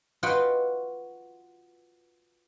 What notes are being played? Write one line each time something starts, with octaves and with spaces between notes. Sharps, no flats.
F4 F#4 B4 D#5 F#5 G5